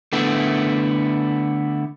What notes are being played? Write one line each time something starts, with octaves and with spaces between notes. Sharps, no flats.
D3 A3 B3 E4